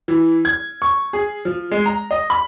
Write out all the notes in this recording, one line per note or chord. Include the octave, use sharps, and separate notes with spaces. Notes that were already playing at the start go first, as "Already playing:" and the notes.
E3
G#6
C#6
G#4
F3
G#3
A#5
D#5
B5